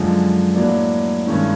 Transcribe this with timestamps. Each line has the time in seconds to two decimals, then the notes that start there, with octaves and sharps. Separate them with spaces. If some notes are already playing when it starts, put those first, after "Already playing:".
Already playing: F#2 D3 F3 G#3
0.54 A2 F#3 A#3 D4
1.26 G2 D#3 G#3 C#4 E4